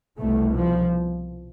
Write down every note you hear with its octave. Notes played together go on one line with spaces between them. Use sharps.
C2 B2 A3
F3